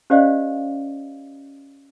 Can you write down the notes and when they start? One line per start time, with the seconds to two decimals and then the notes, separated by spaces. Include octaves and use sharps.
0.10 C#4 G4 C5 D5 D#5 F5